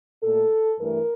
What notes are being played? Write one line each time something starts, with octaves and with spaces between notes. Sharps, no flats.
A#2 A3 A4
G2 E3 A3 A#4